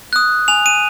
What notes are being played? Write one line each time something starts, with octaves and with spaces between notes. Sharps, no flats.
D#6 F#6
G#5 F7
D#7